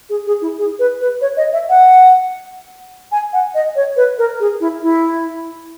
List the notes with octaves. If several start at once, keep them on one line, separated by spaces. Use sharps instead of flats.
G#4
G#4
E4
G#4
B4
B4
C#5
D#5
E5
F#5
G#5
F#5
D#5
C#5
B4
A#4
G#4
E4
E4